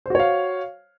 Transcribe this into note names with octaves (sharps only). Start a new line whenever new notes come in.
F#4 C5 C#5 F5